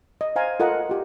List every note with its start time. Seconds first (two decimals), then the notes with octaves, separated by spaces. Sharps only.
0.21 D#5
0.36 C5 F5 G#5 A#5
0.60 F4 A4 A#4 D#5 F#5
0.89 F4 G4